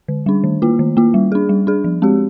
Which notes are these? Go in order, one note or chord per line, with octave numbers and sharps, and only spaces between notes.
D3
G3 D4
D#3
A#3 F4
D#3
A#3 F4
G3
D4 G#4
G3
D4 G#4
F3
G#3 C4 G4